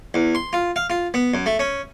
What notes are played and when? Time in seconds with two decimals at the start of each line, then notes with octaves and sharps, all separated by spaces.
0.14 E2
0.35 C6
0.53 F4
0.76 F5
0.90 F4
1.14 B3
1.34 F#2
1.46 A3
1.59 C#4